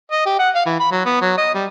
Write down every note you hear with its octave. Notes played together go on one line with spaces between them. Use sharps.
D#5
G4
F#5
F5
E3
B5
F#3
B3
F#3
D#5
G3